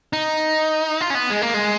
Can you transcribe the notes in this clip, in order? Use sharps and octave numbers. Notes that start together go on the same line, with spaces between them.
D#4
F4
C#4
B3
G#3
A#3
G#3